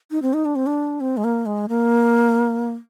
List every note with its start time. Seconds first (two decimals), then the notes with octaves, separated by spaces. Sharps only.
0.11 D#4
0.22 C4
0.34 D#4
0.45 D4
0.56 C4
0.67 D4
1.00 C4
1.17 G#3
1.24 A#3
1.46 G#3
1.69 A#3